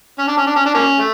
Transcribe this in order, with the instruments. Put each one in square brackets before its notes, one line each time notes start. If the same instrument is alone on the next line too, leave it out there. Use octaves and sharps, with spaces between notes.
[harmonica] C#4
D4
C#4
D4
C#4
D4
A#3 C#4
A3